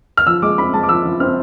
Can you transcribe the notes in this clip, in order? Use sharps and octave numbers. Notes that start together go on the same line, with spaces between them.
F6
F3 E6
G#3 D6
C4 B5
G#3 A5
D6
F3 E6
F3
C4 F6